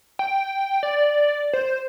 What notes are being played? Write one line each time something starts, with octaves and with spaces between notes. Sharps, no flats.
G5
D5
C5